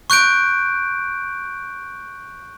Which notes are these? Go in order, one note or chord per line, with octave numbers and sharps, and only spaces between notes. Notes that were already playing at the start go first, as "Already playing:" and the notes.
C#6 F#6 G6 D7